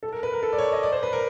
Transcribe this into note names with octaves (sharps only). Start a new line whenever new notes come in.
A4
A#4
B4
A#4
A4
D5
C#5
D5
D#5
D5
C5
B4
A#4